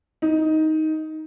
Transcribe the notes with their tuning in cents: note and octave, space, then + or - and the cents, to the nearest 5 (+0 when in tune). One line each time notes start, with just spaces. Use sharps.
D#4 +10